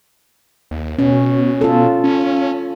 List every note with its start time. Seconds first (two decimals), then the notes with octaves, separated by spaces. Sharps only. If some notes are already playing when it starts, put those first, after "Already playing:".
0.71 D#2
0.99 B2 C#4
1.61 F4 A4
2.04 C#4